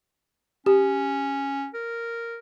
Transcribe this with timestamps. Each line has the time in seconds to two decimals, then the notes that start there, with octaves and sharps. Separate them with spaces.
0.66 C#4 G4
1.74 A#4